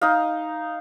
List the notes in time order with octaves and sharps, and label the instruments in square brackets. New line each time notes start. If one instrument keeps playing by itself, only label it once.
[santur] D#4 D#5 F5